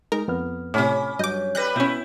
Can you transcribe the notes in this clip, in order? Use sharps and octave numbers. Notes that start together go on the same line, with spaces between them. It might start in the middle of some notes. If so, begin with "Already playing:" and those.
G#3 D#4 A#4
F2 B3 F6
A2 C3 C#4 B5 D6
G2 F#3 D#5 D6 G6
G3 B4 F#6 G6 A#6
B2 B3 C#4 E4 G6